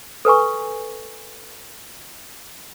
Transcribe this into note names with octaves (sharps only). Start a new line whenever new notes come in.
A4 B4 G#5 C#6